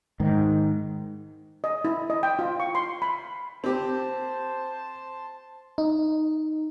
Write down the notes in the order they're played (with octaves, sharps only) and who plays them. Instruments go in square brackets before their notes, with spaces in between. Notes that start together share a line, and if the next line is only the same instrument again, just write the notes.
[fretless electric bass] G#2 D#3
[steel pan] D#5
E4
D#5
G5
F4
C#6
C6
B5
[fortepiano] C4 G4 [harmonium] C5 A5
[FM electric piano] D#4